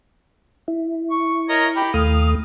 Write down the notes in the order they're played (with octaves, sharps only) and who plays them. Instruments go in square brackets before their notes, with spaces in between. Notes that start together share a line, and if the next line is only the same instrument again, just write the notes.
[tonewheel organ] E4
[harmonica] C#6
A#4 C#5 D#5
G4 B5
[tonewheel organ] D#2 A3 D#6 [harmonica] F5